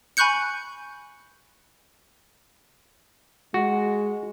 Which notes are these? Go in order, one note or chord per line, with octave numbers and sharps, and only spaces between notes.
G#5 B5 C#6 F#6 G6 C#7
G#3 F#4